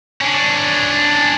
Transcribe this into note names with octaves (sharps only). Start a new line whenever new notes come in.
C#4 D4